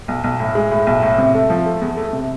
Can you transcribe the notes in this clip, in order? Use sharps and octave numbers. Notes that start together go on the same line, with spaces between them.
B1
B1
A2
G#3
A2
B1
A2
C3
A3
F3
A3
E2
A3
C3